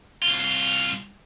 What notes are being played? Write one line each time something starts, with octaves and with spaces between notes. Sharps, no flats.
C2 F4